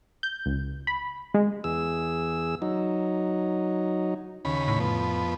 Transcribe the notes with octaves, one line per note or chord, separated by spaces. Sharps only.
G6
C#2
B5
G#3
E2 G#4 E6
F#3 D#4
D#2 C#3 B5
A2
F2 B3